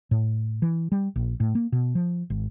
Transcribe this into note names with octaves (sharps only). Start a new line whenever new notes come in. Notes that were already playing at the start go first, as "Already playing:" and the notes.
A2
E3
G3
A#1
A2
A#3
B2
F3
G#1